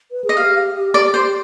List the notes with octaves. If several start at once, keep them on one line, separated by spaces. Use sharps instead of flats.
B4
G#4 D#5
G4 F5
D5
C5